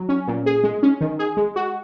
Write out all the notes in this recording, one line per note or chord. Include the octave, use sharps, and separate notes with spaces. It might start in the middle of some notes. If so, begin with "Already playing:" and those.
Already playing: F#3
C#4
A#2
G#4
G#3
C#4
D#3
G#4
G#3
F#4